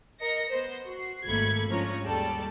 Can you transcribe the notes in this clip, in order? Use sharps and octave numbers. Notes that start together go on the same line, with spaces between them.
A#4 D#5 A#6 C#7
B3 C5
F#4 C7
G#1 A3 A#3 B5 G#6 C#7
G#2 F3 C#4 D4 C#5 A#5
D#2 G3 G#3 G4 A4 D5